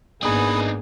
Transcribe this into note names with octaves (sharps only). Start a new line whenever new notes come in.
G#1 A#3 B3 D4 D#4 G#4 B5 D#6